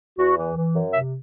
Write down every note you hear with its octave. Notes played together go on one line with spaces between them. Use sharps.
E2 F#4
E3
E3
F#2
C3 E5